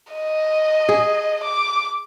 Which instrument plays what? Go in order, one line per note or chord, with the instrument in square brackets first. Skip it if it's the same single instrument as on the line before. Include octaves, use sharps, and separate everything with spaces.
[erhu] D#5
[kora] G#4
[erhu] D6